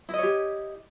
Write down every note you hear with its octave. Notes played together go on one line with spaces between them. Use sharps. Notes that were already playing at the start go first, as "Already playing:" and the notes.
E4 G4 C#5 D#5